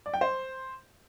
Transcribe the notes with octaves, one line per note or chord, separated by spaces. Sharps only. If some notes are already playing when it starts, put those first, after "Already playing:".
D5
G5
C5